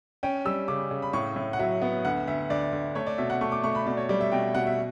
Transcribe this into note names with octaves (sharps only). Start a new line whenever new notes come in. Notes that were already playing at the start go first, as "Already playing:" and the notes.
C#4 G5
G3 E6
C#3 D6
C#3
B5
A2 C#6
A2
F#5
F#3 E5
B3
D2 F#5
D2 E5
D2 D5
D2
A3 C#5
D5
B2 E5
F#5
A3 C#6
D6
A3 C#6
B5
B2 D5
C#5
G3 D5
E5
B2 G5
B2 F#5
E5